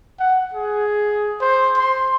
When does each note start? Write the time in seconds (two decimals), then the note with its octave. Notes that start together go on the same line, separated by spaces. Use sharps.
0.19 F#5
0.53 G#4
1.41 C5
1.77 C6